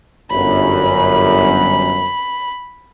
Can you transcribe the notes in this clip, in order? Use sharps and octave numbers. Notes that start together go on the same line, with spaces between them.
G1 F#2 B5